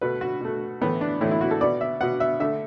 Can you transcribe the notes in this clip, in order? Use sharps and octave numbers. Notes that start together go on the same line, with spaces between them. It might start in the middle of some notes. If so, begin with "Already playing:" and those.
B2 A3 B4
F#4
B2 A3
A2 E3 A3 B3
D4
A2 E3 A3 E4
E4
F#4
A4
B2 B3 D5
E5
B2 B3 F#5
E5
D3 A3 E5